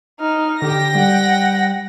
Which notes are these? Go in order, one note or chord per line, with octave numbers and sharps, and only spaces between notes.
D#4 F6
D3 G4 G5 A#6
G3 F#5